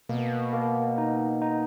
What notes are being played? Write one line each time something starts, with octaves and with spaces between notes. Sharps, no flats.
B2 A#3
A#3
D#4
D#4